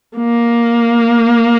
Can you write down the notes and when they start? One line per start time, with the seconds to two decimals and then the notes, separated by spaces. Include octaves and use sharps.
0.17 A#3